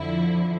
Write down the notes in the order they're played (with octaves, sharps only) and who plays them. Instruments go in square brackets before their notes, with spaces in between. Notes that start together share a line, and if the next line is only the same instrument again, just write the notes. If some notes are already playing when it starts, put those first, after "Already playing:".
Already playing: [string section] F2 D3 F3 E4